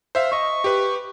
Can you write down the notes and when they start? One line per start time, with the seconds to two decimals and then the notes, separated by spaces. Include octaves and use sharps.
0.15 C5 E5 F5
0.32 D#5 E5 C#6
0.64 G4 B4